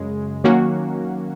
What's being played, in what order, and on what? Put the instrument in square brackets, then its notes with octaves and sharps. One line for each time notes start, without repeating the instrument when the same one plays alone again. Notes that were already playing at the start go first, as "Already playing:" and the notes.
Already playing: [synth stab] F#2 C#3 G#3
D#3 F#3 A#3 C#4 F#4